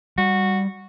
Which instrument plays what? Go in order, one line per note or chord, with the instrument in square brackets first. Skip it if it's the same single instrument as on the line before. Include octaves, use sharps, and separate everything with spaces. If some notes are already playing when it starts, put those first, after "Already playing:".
[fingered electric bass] G3 [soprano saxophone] F#4